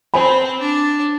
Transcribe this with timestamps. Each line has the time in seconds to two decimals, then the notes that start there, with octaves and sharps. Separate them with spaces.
0.14 C4 C5 G#5 B5
0.60 D4